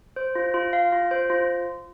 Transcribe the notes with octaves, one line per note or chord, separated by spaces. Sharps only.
C5
F4
F4
F5
F4
C5
F4